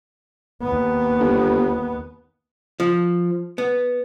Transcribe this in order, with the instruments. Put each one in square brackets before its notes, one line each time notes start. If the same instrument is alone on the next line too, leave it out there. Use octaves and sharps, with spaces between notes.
[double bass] D#2 B3
[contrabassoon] G1
[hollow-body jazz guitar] F3
B3